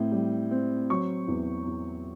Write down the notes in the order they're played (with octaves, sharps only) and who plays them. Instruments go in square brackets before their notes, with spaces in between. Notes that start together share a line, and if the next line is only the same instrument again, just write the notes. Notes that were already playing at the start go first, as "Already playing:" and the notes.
Already playing: [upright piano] A2 C4
G3
C4
F#3 C#6
E2
E2